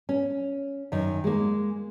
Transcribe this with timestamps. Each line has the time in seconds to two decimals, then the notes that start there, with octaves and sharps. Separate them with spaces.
0.09 C#4
0.92 F#2 D#3
1.24 G#3 A#3